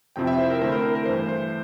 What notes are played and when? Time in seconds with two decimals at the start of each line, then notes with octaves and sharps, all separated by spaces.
0.16 F2 C3 F3 C4 E4 G5
0.27 E5
0.38 C5
0.50 A#4
0.61 D3 A3 C4 E4 C5
0.72 A#4
0.84 A#4
0.95 A#4
1.05 G2 E3 A3 C5
1.29 C5